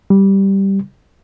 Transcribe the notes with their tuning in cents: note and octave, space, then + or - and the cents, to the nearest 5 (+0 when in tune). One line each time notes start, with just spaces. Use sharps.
G3 -5